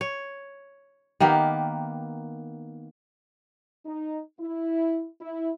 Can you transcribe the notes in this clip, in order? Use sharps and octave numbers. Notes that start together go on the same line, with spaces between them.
C#5
D#3 A#3 B3 G4
D#4
E4
E4